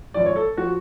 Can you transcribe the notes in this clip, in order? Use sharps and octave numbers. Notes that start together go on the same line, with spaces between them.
G#1 F#2 F3 D5
C#5
A4
F3 F#4